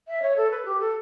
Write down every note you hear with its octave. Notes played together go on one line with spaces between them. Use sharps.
E5
C#5
A4
B4
G4
A4